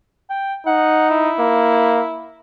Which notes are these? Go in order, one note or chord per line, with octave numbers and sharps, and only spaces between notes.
G5
D#4 F#5
E4
A#3